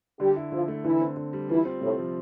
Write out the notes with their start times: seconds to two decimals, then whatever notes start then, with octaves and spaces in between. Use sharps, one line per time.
0.20 D3 G3 G4
0.36 E4
0.52 D3 F3 F4
0.68 A3
0.84 D3 E3 E4
1.01 C4
1.17 D3
1.33 G3
1.49 E3 E4 F4
1.65 C4
1.81 A2 C3 A3
1.98 F3